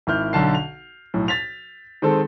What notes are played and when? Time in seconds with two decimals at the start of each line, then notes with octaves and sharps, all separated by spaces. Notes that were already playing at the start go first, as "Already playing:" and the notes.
0.07 G#1 E4 F6 G6
0.33 B1 D3 A5 C7
0.55 F7
1.14 B1 A2
1.28 A6 B6 F7
2.02 D#3 G#3 C4 A4